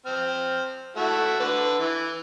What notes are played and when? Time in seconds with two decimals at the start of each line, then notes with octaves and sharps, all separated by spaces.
0.06 C4 F6
0.96 A3 E4 F#4
1.40 D3 B4
1.79 E3